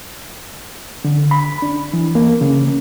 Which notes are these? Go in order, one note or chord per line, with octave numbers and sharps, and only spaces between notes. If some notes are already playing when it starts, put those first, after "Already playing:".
D3
B5
D4
E3
A#3
C#3